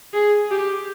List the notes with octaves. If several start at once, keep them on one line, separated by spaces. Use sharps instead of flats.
G#4
G4